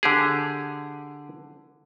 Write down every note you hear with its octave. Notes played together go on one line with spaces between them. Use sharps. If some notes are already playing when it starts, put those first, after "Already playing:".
D3 G4 G#4